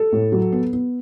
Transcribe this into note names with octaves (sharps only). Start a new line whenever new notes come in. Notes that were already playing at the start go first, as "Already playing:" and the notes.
Already playing: A4
A2
F#3
B3
B3